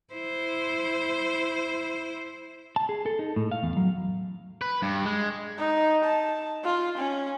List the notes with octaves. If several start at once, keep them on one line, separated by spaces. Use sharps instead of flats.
E4 C5
A5
G#4
A4
D#4
A2
F5
E2
F#3
B4
G2
G#3
D#4
A5
F4
C#4